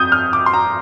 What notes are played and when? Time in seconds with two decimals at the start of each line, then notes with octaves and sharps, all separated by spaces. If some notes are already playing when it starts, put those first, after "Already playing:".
Already playing: F2 D#6 G6
0.12 F6
0.33 D6
0.46 C6
0.53 A#5